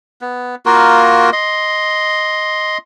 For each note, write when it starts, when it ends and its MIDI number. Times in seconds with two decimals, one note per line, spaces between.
0.21 0.55 59
0.66 1.30 58
0.66 1.30 65
0.66 1.30 66
0.66 1.30 70
1.33 2.78 75
1.33 2.78 84